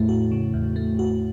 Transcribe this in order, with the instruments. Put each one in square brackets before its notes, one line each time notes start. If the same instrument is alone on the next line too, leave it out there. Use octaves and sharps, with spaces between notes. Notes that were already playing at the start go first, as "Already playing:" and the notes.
Already playing: [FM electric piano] E2 A3 [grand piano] A2
[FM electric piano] F#4
C#3
E2
A3
F#4